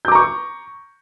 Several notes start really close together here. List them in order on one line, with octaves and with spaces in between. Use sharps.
G6 D6 A#5 C#6